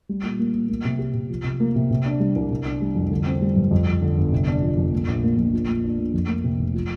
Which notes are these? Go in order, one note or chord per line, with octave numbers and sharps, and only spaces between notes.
G3
A#2
A#3
A#2
A#3
C3
G4
C3
F3
C3
A#3
C3
C3
D4
G3
C2
C3
D4
G3
F2
D3
C4
G3
G2
F2
F3
D3
G1
C3
D4
F3
F2
A#2
A#1
A#3
A#1
F3
A#2
D4
A#2
F2
A#3
C3
F1
F3